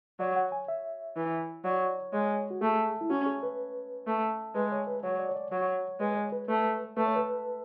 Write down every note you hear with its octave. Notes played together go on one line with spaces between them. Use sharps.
F#3 D5
F#5
G#5
E5
E3
F#3 D5
G#3 C#5
F#4
A3 G#4
E4
C#4 F#4
G#4
B4
A3
G#3 B4
C#5
B4
F#3 C#5
D5
C#5
D5
F#3 C#5
G#3 B4
C#5
B4
A3 B4
A3 B4
C#5
B4